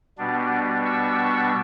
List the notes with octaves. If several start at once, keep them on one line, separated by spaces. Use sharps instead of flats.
B2 G3 B3 D4
C#6 E6
C#6 E6